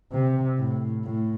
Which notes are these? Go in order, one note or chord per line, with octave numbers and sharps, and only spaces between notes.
C3
A2
A2